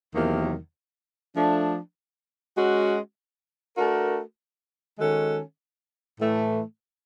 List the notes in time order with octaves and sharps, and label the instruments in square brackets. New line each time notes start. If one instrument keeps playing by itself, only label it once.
[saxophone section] E2 C3 D#3 F#3 A#3
F3 A3 D4
G#3 C#4 F#4
A3 D4 F#4 A#4
D#3 G#3 C#4 F#4 A4
A2 E3 A3